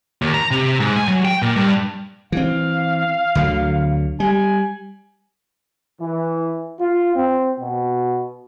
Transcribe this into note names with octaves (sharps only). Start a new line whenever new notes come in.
D#2
A#5
C3
G#2
G#5
F#3
G5
A#2
G2
E3 C4 F5
D2 D3 F#3
G3 G#5
E3
F4
C4
B2